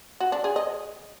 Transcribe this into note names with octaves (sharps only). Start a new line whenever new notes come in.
F#4
D4
G#4
D#5